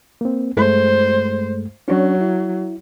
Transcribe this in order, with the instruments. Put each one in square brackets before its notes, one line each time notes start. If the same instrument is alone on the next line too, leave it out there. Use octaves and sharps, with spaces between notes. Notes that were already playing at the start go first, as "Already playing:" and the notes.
[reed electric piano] A#3 C4
[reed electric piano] G2 G#3 A3 [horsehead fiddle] C5
[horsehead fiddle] F#3 [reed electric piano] C#4 D4 C#5
[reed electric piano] E4